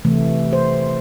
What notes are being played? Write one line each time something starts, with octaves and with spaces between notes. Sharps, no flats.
C3 E3 A3
C5